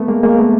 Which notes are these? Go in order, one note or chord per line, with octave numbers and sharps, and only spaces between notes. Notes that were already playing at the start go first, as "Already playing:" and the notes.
Already playing: A3 B3
G#3 A#3
G#3 A#3
A3 B3